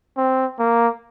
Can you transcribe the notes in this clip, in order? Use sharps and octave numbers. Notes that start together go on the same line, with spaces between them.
C4
A#3